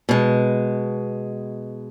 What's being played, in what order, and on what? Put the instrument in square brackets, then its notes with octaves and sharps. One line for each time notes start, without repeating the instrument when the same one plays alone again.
[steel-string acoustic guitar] B2 G#3